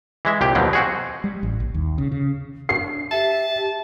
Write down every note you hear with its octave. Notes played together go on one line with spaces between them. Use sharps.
E3 G#3 E5
C2 A#2 G4
D#2 B2 F3 F#3
C4 F#4 G#4
G3
A1
A#1
D#2
C#3
C#3
D4 C7
G4 E5 A5